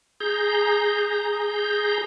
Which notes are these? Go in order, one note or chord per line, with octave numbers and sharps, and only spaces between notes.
G#4 A#5 G6